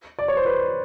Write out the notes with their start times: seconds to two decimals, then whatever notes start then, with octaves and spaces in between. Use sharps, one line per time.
0.19 D5
0.28 C#5
0.37 C5
0.46 B4